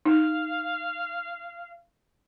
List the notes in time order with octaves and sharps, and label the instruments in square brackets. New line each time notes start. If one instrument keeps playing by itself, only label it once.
[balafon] D#4 [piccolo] F5